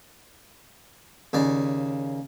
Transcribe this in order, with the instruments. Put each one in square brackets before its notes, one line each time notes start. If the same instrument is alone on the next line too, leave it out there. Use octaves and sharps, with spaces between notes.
[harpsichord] D#2 C#3 D5